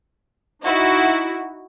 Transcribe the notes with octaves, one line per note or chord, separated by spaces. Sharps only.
D#4 E4 F#4